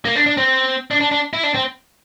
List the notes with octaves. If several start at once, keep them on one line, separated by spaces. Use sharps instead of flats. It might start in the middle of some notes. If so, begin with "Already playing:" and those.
A#3
D4
D4
C4
D4
D4
D4
E4
D4
C4